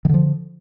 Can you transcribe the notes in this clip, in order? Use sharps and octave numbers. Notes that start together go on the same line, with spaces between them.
D3 D#3 F3